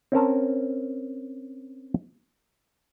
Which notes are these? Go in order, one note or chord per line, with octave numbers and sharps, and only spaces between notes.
C4 C#4 A#4 A5